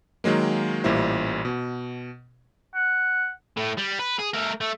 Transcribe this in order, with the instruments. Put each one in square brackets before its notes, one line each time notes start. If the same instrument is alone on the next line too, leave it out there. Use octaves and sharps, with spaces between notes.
[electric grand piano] D#3 F#3 G#3 A#3
A1 A#2 G3 E4 C5
B2
[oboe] F#5
[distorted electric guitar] A2
G3
B4
G#4
A3 A#4
A3